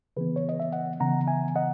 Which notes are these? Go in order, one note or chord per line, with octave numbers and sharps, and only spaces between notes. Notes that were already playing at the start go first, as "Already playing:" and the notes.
C#3 E3 B3 G#4 B4
C#5
D#5
E5
D#5 F#5
C#3 E3 B3 F#5 A#5
E5 G#5
D#5 F#5